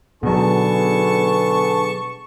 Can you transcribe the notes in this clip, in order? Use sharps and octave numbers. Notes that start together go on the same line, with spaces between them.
B2 D3 F#3 B3 G#4 A5 C#6